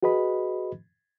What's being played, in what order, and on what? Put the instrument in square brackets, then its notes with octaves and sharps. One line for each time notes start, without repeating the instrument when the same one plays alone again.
[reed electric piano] F#4 G#4 B4 D#5 B5